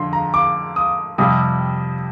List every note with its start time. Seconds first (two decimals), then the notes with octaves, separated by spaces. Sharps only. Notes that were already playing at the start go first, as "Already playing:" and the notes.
Already playing: F2 D3 C6
0.13 A#5
0.34 D6
0.76 D#6
1.18 F2 C3 G3 D#6